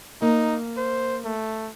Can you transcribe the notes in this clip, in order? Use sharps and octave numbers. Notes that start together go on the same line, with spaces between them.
A#3 D#4
C5
A3